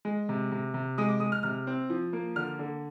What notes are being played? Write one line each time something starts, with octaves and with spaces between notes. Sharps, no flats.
G#3
C3
C3
C3
G#3 D#6
D6
G#3 D#6
F6
C3 F6
C4
F3
A#3
D3 F6
D3